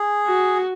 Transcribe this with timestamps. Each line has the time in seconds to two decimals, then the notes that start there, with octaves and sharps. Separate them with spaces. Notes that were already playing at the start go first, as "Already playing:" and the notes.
Already playing: G#4
0.27 F#4